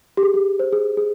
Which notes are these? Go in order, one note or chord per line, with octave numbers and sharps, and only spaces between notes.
G4
G#4
G4
C5
G#4
G#4